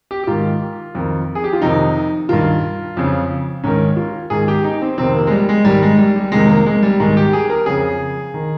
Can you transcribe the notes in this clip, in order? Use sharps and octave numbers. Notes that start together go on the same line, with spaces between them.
G4
G4
G#2 D#3 F4
F2 D#3
G#4
G4
F4
F2 C3 D#3 D#4
G2 D#3 F4
F2 C#3
G#2 D#3 C#4
F4
G#2 D#3 G#4
G4
D#4
C4
F2 C3 D#3 C4
A#3
G#3
G3
G#3
G#2 D#3 G3
G#3
G3
G3
F2 C3 D#3 G#3
A#3
G#3
G3
G#2 D#3 G#3
G4
G#4
A#4
F2 C#3 G#4
D#3